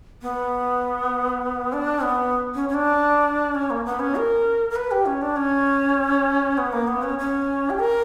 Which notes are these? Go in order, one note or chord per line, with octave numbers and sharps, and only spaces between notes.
B3
D4
B3
C#4
C#4
D4
C#4
A#3
B3
C#4
A#4
A#4
B4
G4
C#4
D4
C#4
B3
A#3
B3
C#4
C#4
G4
A#4